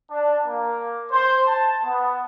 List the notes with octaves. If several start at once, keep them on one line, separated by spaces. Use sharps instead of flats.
D4
A#3
C5
A5
B3